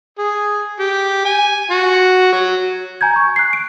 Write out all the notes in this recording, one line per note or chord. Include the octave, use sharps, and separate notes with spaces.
G#4
G4
G#5
F#4
F#3
G#5 A#5 G6 G#6
C#6
F#6 C7
D7